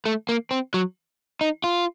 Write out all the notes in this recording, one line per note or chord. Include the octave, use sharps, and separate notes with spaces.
A3
A#3
C4
F#3
D#4
F4